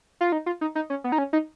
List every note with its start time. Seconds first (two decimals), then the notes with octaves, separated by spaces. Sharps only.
0.21 F4
0.32 D#4
0.46 F4
0.61 D#4
0.75 D#4
0.90 C#4
1.04 B3
1.12 D#4
1.18 C#4
1.33 D#4